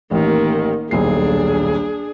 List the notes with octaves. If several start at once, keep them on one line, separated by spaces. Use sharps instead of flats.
A1 D#3 A#3 G4
D#1 B1 D4 G#4 C7